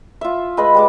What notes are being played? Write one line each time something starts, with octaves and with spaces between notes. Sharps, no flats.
F4 E5
G#3 B4 D#5 B5
G3 G#3 D6